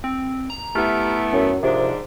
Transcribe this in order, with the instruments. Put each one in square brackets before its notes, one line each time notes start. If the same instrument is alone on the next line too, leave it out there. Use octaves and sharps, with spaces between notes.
[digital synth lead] C4
A#5
[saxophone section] A3 B3 E4 [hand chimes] G4 F6
[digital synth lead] F#2 [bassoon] F#3 [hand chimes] A#4
[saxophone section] G#2 D4 [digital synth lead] C3 [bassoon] F3